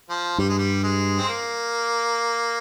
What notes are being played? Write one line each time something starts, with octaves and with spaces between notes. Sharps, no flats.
F3
G2 G3
G#3
G3
G#3
C4
A#3